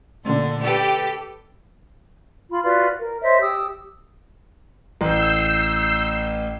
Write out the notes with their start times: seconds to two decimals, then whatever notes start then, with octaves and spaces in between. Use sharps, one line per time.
0.24 A#2 D3
0.64 G4 A4 B4
2.51 F4 B5
2.63 F4 F#4 B4 D5
3.00 A#4
3.22 C5 C#5 D#5 E5
3.41 G4 D#6 E6
5.01 A1 E6 G6 C7